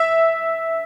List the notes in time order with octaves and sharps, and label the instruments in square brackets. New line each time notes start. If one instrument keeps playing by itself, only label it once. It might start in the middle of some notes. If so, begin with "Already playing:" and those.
Already playing: [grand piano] E5